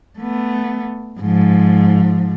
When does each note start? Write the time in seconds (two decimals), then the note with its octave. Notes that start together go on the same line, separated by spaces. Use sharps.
0.19 A3 B3
1.20 G#2 F3